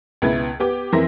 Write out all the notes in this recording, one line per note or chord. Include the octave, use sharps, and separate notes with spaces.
C#2 B2 E4 B4 G#6 A6
B3 G4 D6
F2 E3 A#4 E5 C6 A#6